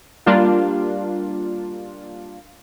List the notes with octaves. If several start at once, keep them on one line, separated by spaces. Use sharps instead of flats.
G3 A#3 D4 F4